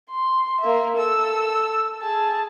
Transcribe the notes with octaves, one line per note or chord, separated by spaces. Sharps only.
C6
A#3 E5
A4 E6
G#4 A5